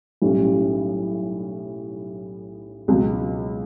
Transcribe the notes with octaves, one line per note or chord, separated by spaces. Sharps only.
B1 A2 G3 C#4
C#2 B2 F#3